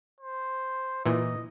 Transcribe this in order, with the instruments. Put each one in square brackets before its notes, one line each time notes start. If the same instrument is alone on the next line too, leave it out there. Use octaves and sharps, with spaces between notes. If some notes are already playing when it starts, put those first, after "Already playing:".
[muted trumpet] C5
[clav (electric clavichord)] A#2 E3 [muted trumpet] D#5